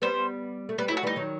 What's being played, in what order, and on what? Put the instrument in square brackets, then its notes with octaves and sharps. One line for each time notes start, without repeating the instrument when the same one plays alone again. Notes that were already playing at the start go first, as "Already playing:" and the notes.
[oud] G3 B3 [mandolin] C5
[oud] A3
[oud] G3 B3 [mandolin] B4
[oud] F#3 A3 [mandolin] E4
[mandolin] F#4
[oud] E3 G3 [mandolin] D#4
[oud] D#3 F#3